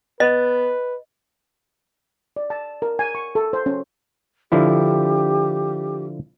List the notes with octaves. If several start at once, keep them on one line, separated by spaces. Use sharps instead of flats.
B3 B4 D#5
D5
A5
A#4
G#5
C#6
A4
C5
C#4
D3 F3 E4 G4